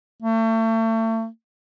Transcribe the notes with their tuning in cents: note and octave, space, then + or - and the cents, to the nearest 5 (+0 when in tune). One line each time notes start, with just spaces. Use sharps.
A3 +35